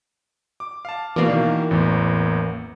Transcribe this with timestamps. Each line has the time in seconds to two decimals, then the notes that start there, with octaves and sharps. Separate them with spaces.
0.60 D6
0.85 F5 A5
1.16 B2 E3 A#3 D5 D6
1.30 B2 D#3
1.71 A1 E2